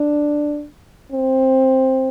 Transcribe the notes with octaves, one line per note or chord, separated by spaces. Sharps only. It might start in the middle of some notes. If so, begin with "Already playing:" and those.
Already playing: D4
C4